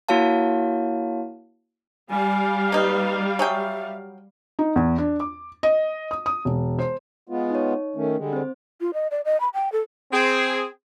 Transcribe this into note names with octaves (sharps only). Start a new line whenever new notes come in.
A#3 E4 F#4 C#5 F5 A5
G3 F5 G#5
A#3 D#4 B4
F#3 G#4 E5 G5
D#4
E2
D4
D6
D#5
D#6
D#6
E1
C5
G#3 B3 F4
D#4 C#5
D#3 A3 C#4
D3 G3 G#3
C4 C5
F4
D#5
D5
D#5
B5
G5
A4
C4 G#4